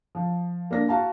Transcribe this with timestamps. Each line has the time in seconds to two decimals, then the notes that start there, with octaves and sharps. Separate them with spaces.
0.15 F3
0.71 A#3 D4 A#6
0.88 F#4 F5 A5 A#5